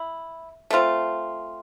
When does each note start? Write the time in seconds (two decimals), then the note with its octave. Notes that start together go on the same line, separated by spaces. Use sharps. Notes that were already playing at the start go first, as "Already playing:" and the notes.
Already playing: E4
0.70 A3 C4 F4